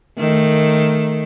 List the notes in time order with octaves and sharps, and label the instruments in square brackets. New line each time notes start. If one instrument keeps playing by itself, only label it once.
[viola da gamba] D#3 A3